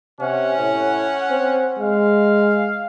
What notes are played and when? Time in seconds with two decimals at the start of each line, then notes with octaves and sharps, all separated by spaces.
0.20 C3 C#4 F#5
0.59 A2
1.31 C4
1.79 G#3 F5